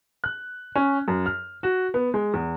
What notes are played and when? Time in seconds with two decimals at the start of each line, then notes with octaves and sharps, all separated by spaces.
0.24 F#6
0.76 C#4
1.08 F#2
1.26 F6
1.63 F#4
1.94 B3
2.14 G#3
2.34 E2